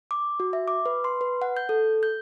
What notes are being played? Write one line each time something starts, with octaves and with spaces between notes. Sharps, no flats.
D6
F#4
E5
D6
B4
C6
B4
F#5
G6
A4
G6